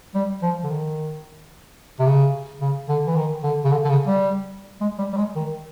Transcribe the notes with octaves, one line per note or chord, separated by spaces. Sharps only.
G3
F3
D3
D#3
C3
C#3
C#3
D3
E3
D#3
D3
C#3
D3
D3
C#3
G3
G#3
G3
G3
G#3
D#3